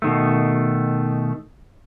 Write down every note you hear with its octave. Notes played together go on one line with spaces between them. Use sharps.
B2 D#3 A3